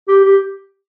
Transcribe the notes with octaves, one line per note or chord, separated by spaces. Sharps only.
G4
G4